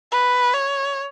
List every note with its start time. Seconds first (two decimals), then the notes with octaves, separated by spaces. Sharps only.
0.12 B4
0.54 C#5